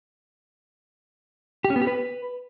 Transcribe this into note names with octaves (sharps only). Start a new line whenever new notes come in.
G4
C#4
B3
G4
B4